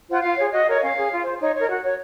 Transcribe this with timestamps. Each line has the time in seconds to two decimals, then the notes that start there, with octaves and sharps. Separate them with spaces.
0.08 F4 C5 F#5
0.22 F4 F5
0.37 G#4 C#5
0.51 F#4 D#5
0.66 A#4 C#5
0.81 C#4 F5
0.96 G#4 C#5
1.11 F4
1.24 C5
1.40 D#4 C#5
1.54 A#4 C#5
1.69 F#4
1.83 C#5